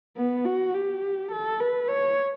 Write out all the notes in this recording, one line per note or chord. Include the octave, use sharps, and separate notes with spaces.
B3
F#4
G4
A4
B4
C#5